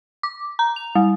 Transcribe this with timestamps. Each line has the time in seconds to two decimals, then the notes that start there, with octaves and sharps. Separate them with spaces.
0.23 D6
0.59 A#5
0.76 F7
0.95 G3